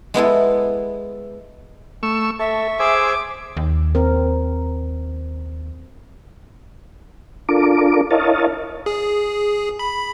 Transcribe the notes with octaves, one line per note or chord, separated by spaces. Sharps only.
G#3 B3 E4 A4
A3 C#6 E6
A4 E5 C#6
G#4 C5 G#5 D6 E6
D#2
C4 A#4
D4 F4 A4 A#4 D6
E4 A#4 C#5 D#5 F5 A5
G#4
B5